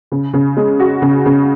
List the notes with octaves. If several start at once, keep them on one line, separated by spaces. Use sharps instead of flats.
C#3
C#3
G#3
F#4
C#3
C#3